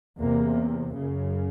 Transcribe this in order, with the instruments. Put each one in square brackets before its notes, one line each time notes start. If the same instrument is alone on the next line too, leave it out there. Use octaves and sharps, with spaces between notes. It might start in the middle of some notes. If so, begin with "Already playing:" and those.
[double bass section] E2 C3 A#3
F#2 C#3